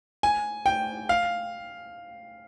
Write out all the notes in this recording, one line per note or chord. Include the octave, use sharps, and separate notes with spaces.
G#5
G5
F5